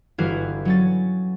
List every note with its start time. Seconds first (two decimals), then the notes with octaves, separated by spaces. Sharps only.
0.18 G1 E3 E4 F#4 F5 G#6
0.65 F#3 C#4 A6